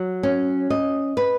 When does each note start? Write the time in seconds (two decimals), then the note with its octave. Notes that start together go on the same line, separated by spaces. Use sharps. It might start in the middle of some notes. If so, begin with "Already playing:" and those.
Already playing: F#3
0.23 C#4
0.70 D#5
1.17 B4